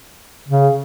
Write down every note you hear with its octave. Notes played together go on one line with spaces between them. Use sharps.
C#3